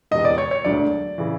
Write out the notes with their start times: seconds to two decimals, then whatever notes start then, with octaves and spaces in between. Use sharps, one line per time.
0.11 E1 E2 C3 D#5
0.25 D5
0.38 C#5
0.51 C#5
0.65 E1 D2 D3 F#3 D5
1.18 C#3 E3